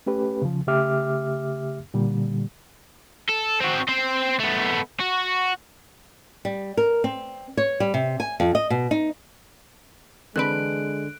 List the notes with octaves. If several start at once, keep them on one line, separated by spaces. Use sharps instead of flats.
A3 C#4 G4 B4
C#3 F3
C#3 A3 G4 E5 D6 F6
A#2 D3 G3
A4
C4 F#4
C4 C5
A3 B3
F#4
G3
A#4
C4
C#5
G3
C3
G#5
F2
D#5
B2
D#4
D3 E3 G#3 C4 B4 F#6 D7